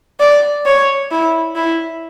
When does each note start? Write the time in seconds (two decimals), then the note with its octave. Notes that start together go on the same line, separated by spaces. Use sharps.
0.20 D5
0.66 C#5
1.11 E4
1.56 E4